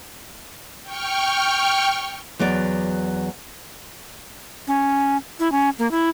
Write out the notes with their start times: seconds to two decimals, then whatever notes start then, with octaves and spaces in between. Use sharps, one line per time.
0.83 G5 C#6 F6
2.39 E2 F#3 B3 D5
4.67 C#4
5.39 E4
5.52 C#4
5.79 A#3
5.91 E4